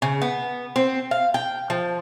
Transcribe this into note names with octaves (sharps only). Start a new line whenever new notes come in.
C#3
B3
C4
F5
G5
F3